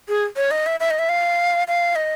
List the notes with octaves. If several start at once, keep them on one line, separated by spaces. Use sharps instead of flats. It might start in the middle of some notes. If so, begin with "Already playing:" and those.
G#4
C#5
D#5
E5
E5
D#5
E5
F5
F5
D#5